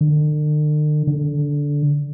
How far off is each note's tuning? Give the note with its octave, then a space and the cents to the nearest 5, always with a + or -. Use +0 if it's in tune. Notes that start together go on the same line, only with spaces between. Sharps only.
D3 +45
D3 -15